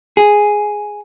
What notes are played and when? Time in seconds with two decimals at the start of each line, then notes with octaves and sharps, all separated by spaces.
0.17 G#4